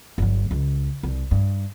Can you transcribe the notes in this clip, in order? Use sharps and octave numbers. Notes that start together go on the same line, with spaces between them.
G1 F#3
C#2
C2
G2